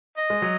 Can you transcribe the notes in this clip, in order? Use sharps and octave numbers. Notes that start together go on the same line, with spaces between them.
D#5
G#3
F#3